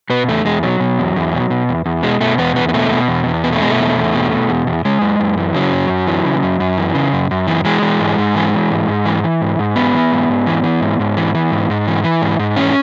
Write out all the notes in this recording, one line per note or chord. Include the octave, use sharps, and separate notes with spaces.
B2 B3
E2 A3
E2 G#3
B2 F#3
B2
E2
E2
B2
B2
E2
E2
B2 G#3
B2 A3
E2 B3
E2 B3
B3
B2 A3
B2
E2
E2
B2 B3
A3
B2 G#3
A3
E2
E2
B2
B2
E2
E2
C#3 G#3
F#2
F#2
E3
C#3 F#3
F#2
F#2
E3
C#3
F#2
F#2
E3
C#3
F#2
F#2
E3
E3 G#3
E3
G#2
G#2
E3
E3
G#2
G#2
E3
E3
G#2
G#2
E3 B3
E3
G#2
G#2
E3
E3
G#2
G#2
E3
E3
G#2
G#2
E3
E3
G#2
G#2
E3 C#4